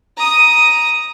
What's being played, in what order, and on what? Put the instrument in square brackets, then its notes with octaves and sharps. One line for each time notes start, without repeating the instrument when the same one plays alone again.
[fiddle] A#5 D#6